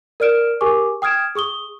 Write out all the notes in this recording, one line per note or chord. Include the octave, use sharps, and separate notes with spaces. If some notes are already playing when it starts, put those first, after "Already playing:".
A#4 D5 F6 D7 E7
G4 G#4 A#4 G#5 C#6 D6
G5 D#6 F6 G#6 D7 E7
G#4 C#6 D#6 G7